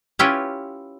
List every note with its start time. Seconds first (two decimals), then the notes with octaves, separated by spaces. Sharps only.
0.19 C#4 E4 F4 G4 B4 C#5